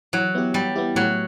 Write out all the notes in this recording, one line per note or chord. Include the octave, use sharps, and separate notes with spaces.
E3 F#3
B3 E4 G4
E3 G3
B3 E4 G4
A2 F#3